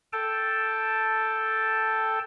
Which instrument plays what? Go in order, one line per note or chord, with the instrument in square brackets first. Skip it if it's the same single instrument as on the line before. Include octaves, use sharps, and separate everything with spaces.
[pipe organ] A4 G5 A5